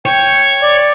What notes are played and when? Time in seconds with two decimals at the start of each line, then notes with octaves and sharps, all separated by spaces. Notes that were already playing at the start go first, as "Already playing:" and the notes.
0.06 C#5 G5
0.62 D5